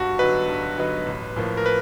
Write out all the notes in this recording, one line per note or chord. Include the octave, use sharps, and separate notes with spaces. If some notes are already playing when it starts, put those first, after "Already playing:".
Already playing: G2 F#4
D3 F#3 B3 D#4 B4
G2
D3 F#3 B3 D#4
A1
A2 F3 A#3
A#4
B4